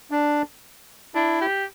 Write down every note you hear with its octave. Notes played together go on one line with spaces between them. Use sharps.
D4
D4 E4
G4